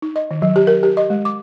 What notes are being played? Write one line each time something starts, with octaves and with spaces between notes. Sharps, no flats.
D#4
D#5
D#3
F#3
G4
A#4
G4
D#5
G#3
D6